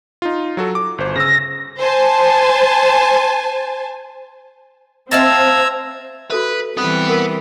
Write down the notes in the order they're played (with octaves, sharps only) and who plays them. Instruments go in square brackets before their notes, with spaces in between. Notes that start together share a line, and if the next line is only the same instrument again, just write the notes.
[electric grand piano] D#4 F4
F#3 F#4 A4
D6
G1 C5
[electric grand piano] C#3 E6 [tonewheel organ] A#6
[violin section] C5 G#5 A5
[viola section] C4 [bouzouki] E5 F5 A5 [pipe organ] A#5 E6 G#6
[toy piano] F#4 A4 E5 [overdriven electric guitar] B4
[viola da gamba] E3 G3 C4 [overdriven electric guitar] B3 B4 [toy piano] D#6
[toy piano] A#4